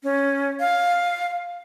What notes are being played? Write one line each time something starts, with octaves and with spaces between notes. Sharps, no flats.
C#4
F5